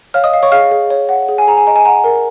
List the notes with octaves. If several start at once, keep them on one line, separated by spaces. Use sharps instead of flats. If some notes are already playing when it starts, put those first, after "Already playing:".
C#5 F5 F6
D#5 D#6
F5
C#5 C#6
G#4 F5 F6
G#4
C#5
F#5
G#4
G#5
G#4 A#5
G#5
D#5 A#5
G#5
F#5 A#5
A#4